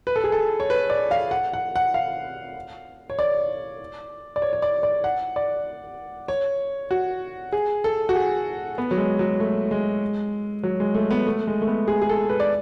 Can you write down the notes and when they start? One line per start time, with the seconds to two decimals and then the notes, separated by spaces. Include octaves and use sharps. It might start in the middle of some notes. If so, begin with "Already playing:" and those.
0.07 B4
0.16 A4
0.24 G#4
0.32 A4
0.60 C#5
0.70 B4
0.90 D5
1.11 F5
1.31 F#5
1.53 F#5
1.76 F#5
1.94 F5
3.10 C#5
3.19 D5
4.36 D5
4.42 C#5
4.53 C#5
4.62 D5
4.83 D5
5.04 F#5
5.36 D5
6.28 C#5
6.91 F#4
7.52 G#4
7.84 A4
8.09 F#4
8.15 G#4
8.78 B3
8.91 F#3
8.98 G#3
9.19 F#3
9.40 A3
9.71 G#3
10.63 F#3
10.80 G#3
10.95 A3
11.11 B3
11.27 A3
11.47 G#3
11.62 A3
11.67 B3
11.88 G#4
12.02 G#4
12.10 A4
12.30 B4
12.40 D5